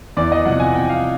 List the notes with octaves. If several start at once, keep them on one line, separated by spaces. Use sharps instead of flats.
E2 D5
D#5
C3 F3 F#5
G#5
E2 G5
F5